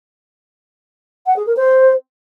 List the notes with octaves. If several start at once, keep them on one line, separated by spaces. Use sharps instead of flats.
F#5
G#4
A#4
C5